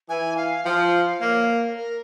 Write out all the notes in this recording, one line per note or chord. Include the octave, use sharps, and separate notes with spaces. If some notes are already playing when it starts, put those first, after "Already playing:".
E3 G#5
F5
F3 G5
F5
A#3 C#5 F5
A#4
A#4